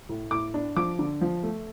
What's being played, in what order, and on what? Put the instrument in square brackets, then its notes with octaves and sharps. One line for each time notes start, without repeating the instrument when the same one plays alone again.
[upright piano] A2
A2 D6
D4
F3 D6
D3
F3
A3